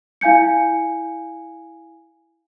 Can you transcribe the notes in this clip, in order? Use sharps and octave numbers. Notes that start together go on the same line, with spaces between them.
E4 F5 G#5 G6 C#7